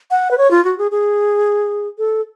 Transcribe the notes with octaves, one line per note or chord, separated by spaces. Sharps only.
F#5
B4
C#5
F4
F#4
G#4
G#4
A4